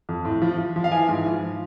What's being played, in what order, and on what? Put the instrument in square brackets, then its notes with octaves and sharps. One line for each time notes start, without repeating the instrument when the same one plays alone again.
[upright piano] F2
A2
F3
F3
F3
F5
E3 G#5
G#2
F3